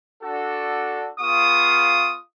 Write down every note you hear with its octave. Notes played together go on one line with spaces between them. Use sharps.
D4 F#4 A4
B3 F4 G#4 F5 C#6 D#6